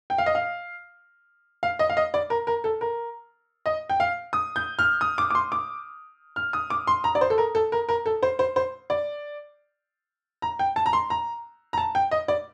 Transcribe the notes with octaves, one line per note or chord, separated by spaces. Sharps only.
G5
F5
D#5
F5
F5
D#5
F5
D#5
D5
A#4
A#4
A4
A#4
D#5
G5
F5
D#6
G6
F6
D#6
D6
D6
C6
D6
F6
D#6
D6
C6
A#5
D5
C5
A4
A#4
A4
A#4
A#4
A4
C5
C5
C5
D5
A#5
G5
A5
A#5
C6
A#5
A#5
A5
G5
D#5
D5